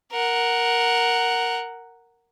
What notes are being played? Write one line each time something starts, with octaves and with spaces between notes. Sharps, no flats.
A#4 F#5